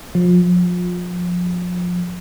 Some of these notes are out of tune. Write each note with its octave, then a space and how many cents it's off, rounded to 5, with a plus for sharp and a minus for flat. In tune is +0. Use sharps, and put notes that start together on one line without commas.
F3 +30